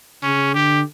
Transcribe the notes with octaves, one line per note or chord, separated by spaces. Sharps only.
C#3 C#4
D3 G4